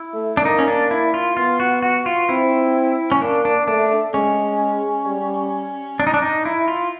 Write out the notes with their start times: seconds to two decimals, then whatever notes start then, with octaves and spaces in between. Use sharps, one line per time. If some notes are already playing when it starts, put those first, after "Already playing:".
Already playing: E4
0.14 A3
0.37 D4
0.44 A#3 D#4
0.59 C#4
0.68 D4
0.91 E4
1.14 F4
1.37 B3 F4
1.60 F#4
1.83 F#4
2.06 F4
2.29 C4 E4
3.12 C#4
3.21 A#3 D4
3.45 D4
3.68 A3 D4
4.14 G#3 C#4
5.06 G3
6.00 D4
6.07 D#4
6.14 D4
6.22 D#4
6.45 E4
6.68 F4